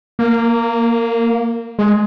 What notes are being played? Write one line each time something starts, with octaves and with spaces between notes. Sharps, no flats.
A#3
G#3